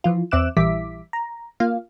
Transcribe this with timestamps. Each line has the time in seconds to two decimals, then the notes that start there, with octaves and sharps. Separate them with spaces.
0.04 E3 F3 F4
0.31 E2 C4 E5 D6 F#6 E7
0.57 A#1 E3 G3 E5 D6 B6
1.13 A#5
1.60 A#3 F4 F5